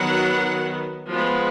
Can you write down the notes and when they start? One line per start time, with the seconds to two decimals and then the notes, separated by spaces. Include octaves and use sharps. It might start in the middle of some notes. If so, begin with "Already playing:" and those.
Already playing: D#3 F#3 B3 F#5
1.12 F3 G#3 B3